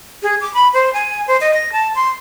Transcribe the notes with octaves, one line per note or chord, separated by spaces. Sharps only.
G#4
D6
B5
C5
G#5
C5
D#5
A#6
A5
C6